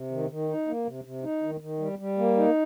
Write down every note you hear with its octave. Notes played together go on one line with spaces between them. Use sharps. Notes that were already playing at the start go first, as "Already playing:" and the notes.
Already playing: C3
D#3
D#3
D#4
A#3
C3
C3
D#4
D#3
D#3
G3
G3
A#3
D#4